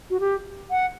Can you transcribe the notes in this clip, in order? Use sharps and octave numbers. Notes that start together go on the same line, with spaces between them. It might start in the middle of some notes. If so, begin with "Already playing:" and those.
F#4
G4
F#5